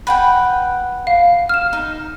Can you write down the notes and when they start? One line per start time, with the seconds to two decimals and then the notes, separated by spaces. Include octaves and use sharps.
0.07 B4 F#5 G5
1.07 F5
1.49 F6 E7
1.73 D#4